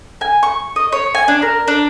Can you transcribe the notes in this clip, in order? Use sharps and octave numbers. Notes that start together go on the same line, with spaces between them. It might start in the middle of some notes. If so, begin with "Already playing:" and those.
G#5
C#6
D#5
C#5
G#5
D4
A#4
D4